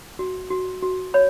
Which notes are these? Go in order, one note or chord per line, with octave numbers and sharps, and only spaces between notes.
F#4
F#4
F#4
C#5 B5